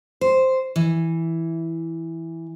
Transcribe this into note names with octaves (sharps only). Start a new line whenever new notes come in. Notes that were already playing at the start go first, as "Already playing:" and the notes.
C5
E3